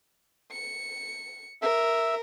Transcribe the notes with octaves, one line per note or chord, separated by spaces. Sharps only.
C#7
A#4 E5